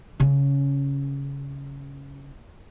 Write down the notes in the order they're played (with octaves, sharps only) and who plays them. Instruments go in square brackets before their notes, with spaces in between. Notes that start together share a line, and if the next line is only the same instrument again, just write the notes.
[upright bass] C#3 C#4